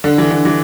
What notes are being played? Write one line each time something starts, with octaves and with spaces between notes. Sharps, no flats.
D3
E3
D3
E3